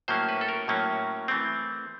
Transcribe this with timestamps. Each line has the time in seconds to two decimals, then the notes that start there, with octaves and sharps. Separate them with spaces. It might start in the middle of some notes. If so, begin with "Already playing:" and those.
0.08 A2 F#3 A#3 C#4 C5
0.29 B4
0.41 A4
0.49 A#4
0.68 A2 F#3 A#3 C#4
1.28 E3 A3 C4